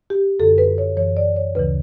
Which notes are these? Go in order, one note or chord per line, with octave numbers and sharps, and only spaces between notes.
G4
F#2 D3 A4
B4
C#5
F#2 E3 C#5
D5
C#5
D2 C#3 E3 B4